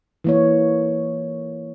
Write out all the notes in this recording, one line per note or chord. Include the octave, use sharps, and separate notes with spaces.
E3 A#3 C#5